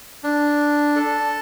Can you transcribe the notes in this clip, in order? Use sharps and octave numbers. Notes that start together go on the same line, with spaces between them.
D4
A4